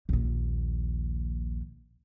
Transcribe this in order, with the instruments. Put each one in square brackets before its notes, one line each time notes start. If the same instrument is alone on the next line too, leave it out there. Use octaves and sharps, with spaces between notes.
[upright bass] A#1 D#2